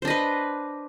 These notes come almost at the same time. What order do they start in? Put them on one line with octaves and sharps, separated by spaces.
C5 D4 D#5 B4